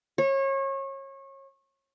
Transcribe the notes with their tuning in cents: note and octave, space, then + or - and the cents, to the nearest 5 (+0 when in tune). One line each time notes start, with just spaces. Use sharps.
C#5 -30